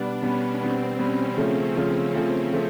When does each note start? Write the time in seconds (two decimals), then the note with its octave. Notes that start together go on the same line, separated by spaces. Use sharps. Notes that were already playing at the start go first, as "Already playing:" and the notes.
Already playing: B2 G3 B3 D4
0.22 B2 G3 B3 C#4
0.61 B2 G3 B3 C4
0.98 B2 G3 B3 C#4
1.37 C#3 F3 A3
1.75 C#3 F3 A3
2.14 C#3 F3 A3
2.53 C#3 F3 A3